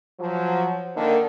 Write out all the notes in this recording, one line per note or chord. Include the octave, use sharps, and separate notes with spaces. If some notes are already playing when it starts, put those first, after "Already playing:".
F3 F#3
D3 D#3 A#3